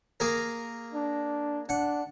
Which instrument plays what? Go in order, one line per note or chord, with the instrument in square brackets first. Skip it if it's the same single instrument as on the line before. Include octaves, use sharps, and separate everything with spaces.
[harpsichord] A#3 G#4 A#4
[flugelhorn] D4
[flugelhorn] D4 [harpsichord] F#5